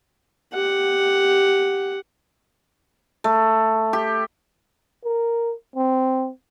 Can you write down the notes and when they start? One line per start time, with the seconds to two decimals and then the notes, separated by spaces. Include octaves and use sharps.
0.53 G4 F#5
3.24 A3
3.93 G4
5.04 A#4
5.76 C4